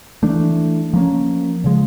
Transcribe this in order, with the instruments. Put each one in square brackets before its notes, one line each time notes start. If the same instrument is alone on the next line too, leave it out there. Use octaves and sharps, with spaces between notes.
[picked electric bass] E3 A3 D4
F3 A#3 C#4
C#3 F3 G#3